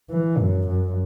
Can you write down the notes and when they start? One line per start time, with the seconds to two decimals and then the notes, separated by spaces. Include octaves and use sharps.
0.10 E3
0.39 F#2
0.69 F#2